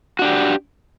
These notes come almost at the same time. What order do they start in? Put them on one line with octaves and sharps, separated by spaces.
F#4 D4 G4